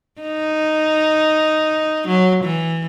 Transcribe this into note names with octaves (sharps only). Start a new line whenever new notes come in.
D#4
F#3
E3